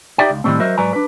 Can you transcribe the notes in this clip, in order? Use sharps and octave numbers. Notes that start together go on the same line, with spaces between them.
D#4 G4 D5 E5 G5
C#2
A2 D#3 E3 G3 A3 C4
F#3 F#4 A#4 C5 D#5 E5
G#2 F#3 B4 D5 G#5 A#5
D4 B4